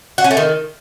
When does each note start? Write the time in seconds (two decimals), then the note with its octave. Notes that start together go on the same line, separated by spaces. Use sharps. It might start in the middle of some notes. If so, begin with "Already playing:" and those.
0.18 F#4
0.24 C#4
0.31 A3
0.37 D#3